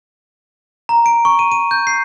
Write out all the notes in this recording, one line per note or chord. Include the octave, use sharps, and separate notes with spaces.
A#5
D7
C#6
D#7
D#7
G6
C7